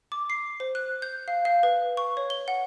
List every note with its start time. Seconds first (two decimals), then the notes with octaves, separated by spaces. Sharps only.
0.12 D6
0.30 C7
0.60 C5
0.75 F#6
1.02 G6
1.28 F5
1.45 F5
1.63 B4
1.97 C#6
2.17 C#5
2.30 G7
2.48 F#5